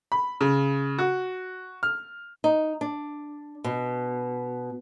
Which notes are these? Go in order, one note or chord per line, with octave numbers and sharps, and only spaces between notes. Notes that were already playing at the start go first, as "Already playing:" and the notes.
B5
C#3
F#4
F6
D#4
D4
B2